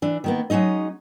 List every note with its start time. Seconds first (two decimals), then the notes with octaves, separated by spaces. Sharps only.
0.02 E3 D4
0.24 D#3 A#3 B3
0.50 F#3 G#3 C#4 D#4 D#5